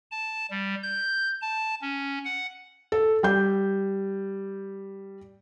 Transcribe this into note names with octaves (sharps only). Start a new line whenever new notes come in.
A5
G3
G6
A5
C#4
F#5
A4
G3 G6